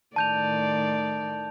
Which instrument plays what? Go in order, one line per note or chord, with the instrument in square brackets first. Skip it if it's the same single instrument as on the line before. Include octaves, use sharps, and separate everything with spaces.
[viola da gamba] A2 D#3 D5 [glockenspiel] A5 G6 F7